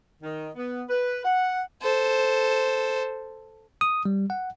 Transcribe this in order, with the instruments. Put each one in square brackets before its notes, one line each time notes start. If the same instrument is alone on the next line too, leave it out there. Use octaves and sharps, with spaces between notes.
[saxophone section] D#3
B3
B4
F#5
[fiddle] A4 C5
[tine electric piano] D#6
G3
F#5